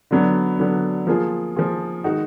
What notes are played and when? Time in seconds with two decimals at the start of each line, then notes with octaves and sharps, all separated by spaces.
0.11 D3 F#3 B3 D4
0.59 D3 F#3 B3 D4
1.07 F3 A#3 F4 G#4
1.56 F3 A#3 F4 G#4
2.04 D#3 G#3 D#4 F#4